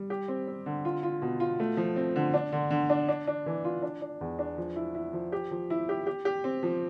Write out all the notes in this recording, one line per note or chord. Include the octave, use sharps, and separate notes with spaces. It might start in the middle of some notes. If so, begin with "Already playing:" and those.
Already playing: G3
G4
C4
C4
D3
F4
F4
B2
F4
A3
F3
C4
D3
D4
D3
D3
D4
D4
D4
E3
F4
D4
D4
E2
D4
F3
E4
E4
F3
G4
F3
E4
G4
G4
G4
C4
F3